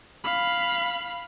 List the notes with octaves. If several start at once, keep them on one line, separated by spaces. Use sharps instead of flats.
F5 B5